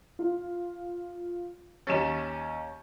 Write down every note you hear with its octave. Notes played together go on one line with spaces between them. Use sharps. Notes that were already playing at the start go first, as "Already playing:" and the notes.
F4
D#2 C#4 A6 B6 E7